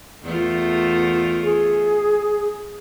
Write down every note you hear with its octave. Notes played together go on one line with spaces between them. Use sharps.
E2 A3 F4
G#4